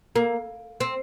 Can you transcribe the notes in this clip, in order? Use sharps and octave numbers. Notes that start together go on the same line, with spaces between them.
A#3
C4